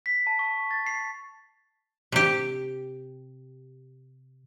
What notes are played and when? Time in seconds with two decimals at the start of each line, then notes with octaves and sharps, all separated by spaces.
0.06 B6
0.27 A5
0.39 C#6
0.71 A6
0.87 C7
2.12 C3 G4